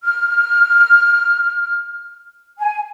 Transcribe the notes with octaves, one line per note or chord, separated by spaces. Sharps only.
F6
G#5